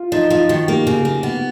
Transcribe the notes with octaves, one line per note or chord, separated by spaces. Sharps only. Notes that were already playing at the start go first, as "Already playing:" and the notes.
Already playing: F4
F3 D#4
F3 F4
D#3 F#4
A#3 G4
C#3
A#3
B3